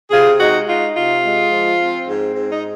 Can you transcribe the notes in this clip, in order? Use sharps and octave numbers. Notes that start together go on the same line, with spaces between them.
C3 F4 G#4
G#3 D#4 F#4
D#4 F4
C3 F4
G#3
F3
C4
G#2
G#2
D#4